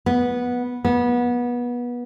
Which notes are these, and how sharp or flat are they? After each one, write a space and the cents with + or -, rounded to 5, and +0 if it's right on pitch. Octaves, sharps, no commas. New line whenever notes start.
B3 -10
B3 -25